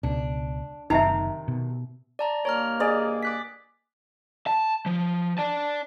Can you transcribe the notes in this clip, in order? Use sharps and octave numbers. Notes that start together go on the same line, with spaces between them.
C#2 B2 D4
F#1 C3 D#3 D#4 D#5 E5 A#5
B2
D5 A5 A#5
G2 D#3 A#3 C#5 A#5 F6
G#4 D5 D#5
D6 F#6 B6
A5
F3
D5 A5